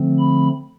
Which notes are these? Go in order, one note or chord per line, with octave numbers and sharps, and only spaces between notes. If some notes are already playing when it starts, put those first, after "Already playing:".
Already playing: D3 F3 A3 C4
B5